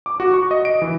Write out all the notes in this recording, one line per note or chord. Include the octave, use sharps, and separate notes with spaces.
D6
F#4
C#6
D#5
D7
E3